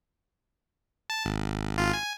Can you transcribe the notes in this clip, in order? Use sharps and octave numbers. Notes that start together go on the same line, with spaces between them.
A5
G#1
G#1 F4
G#5